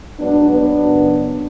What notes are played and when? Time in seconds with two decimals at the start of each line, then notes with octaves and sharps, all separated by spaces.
0.19 G#2 F#3 B3 D4
0.48 B3 D4
0.79 F#2 C#3 F#3